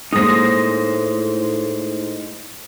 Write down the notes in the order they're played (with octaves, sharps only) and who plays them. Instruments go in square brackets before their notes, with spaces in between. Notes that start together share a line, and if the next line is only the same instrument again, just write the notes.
[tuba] A2 [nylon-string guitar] G#3 A#3 G#4 [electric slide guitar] D#4 C5 [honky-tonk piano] D#6 A#6